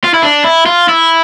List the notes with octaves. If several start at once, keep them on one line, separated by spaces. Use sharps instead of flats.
F4
E4
D4
E4
F4
E4